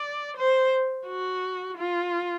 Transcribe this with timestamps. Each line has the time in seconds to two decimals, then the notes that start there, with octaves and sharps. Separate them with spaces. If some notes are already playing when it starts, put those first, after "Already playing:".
Already playing: D5
0.37 C5
1.07 F#4
1.78 F4